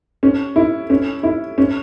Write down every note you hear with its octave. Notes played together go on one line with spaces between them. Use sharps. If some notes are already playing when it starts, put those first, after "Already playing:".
C#4
E4
C#4
E4
C#4